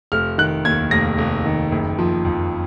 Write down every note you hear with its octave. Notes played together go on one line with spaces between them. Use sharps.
F1 F6
D#3 F#6
D#2 G#6
F1 A#6
F1
D#3
F#1
F3
F2